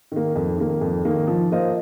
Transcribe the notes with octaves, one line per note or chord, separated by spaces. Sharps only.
D#3 A#3
F2
D#3 A#3
F2
D#3 A#3
F3
A#3 F4 C5 D#5